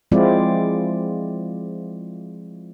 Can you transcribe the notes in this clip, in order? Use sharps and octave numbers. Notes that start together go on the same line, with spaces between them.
F3 G#3 C4 E4 F4 D5